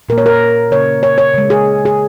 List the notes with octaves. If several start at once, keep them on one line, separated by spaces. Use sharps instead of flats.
A#2 A#3 A#4
C#5
A#4
C#3 A#3 C#5
C#5
C#5
C#3 G#3
G#4
G#4